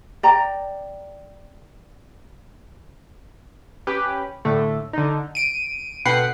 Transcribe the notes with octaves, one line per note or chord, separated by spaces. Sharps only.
D5 G5 A#5
C#4 G4 B4
A2 D3 A3
D3 D#4
D7 D#7
B2 D3 B4 F#5 G5 C7